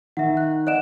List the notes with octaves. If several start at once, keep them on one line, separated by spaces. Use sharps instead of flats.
D#3 E5 F#5
F#6
D5 D#5 F#5 F#6 D7 E7